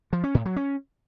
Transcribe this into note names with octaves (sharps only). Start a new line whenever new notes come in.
F3
C#4
A2
F#3
C#4